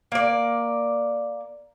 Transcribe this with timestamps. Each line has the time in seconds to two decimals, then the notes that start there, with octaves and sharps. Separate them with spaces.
0.12 A#3 D5